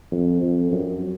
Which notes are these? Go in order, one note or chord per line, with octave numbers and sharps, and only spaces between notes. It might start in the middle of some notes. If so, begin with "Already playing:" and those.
F2
F2
F#2